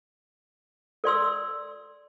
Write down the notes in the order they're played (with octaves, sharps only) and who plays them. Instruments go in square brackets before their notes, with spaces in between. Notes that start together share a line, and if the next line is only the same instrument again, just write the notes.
[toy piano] A4 D5 C6 E6